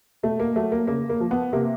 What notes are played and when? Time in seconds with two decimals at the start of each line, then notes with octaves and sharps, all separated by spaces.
0.23 B2 A3
0.40 A#3
0.56 F#3 A3
0.72 A#3
0.87 C#3 A#3
1.10 A#3
1.20 F3
1.31 B3
1.53 C3 A#3